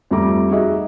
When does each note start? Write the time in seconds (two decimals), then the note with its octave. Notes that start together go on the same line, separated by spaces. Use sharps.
0.11 F2 G3 A3 A#5 D6
0.50 D#4 F#4 G#4 D#5 E5